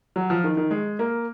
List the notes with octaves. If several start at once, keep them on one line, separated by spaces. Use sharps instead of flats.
F#3
F3
D#3
D#3
G#3
A#3